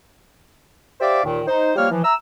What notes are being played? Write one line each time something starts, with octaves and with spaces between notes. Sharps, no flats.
G4 C5 D5 E5 F5 D6
D#2 A#2 D#3
D#4 C5
F3 G3 A#3 C#5 F6
E3 F3
E5 A#5 E6